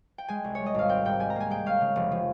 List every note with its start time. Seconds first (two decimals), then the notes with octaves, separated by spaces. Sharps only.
0.18 G5
0.28 G#3 G#5
0.44 C2
0.55 G3 C#5
0.66 D#5
0.75 G#1 F5
0.89 C4 G5
1.05 G#2 G5
1.20 G3 G#5
1.30 A#5
1.36 A#3 G#5
1.50 G#3 G5
1.66 C#4 F5
1.81 C#3
1.96 F1
2.12 F3